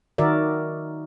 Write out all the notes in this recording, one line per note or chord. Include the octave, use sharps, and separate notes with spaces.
D#3 F#4 A#4 D5 E5